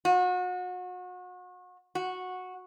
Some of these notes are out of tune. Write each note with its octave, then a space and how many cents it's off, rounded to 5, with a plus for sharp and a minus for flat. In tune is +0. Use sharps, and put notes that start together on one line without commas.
F#4 -35
F#4 -10